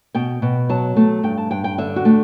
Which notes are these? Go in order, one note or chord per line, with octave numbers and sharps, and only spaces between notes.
B2 G5
B2
F#3 A5
A3 A5
G2 G5
A5
G2 G5
G5
D3 E5
F#4
A3